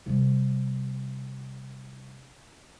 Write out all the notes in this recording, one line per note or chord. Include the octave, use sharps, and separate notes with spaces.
C3 G3